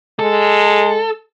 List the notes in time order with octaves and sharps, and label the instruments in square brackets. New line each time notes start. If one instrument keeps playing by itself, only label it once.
[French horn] G#3 [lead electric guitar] A4